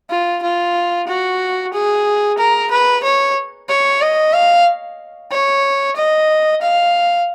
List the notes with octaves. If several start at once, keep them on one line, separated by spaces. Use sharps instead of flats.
F4
F4
F#4
G#4
A#4
B4
C#5
C#5
D#5
F5
C#5
D#5
F5